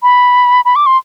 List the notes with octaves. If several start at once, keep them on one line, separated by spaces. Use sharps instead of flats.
B5
B5
D6
C6